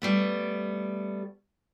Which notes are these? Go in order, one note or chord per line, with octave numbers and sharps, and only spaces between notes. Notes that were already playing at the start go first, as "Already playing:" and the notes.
G3 A3 B3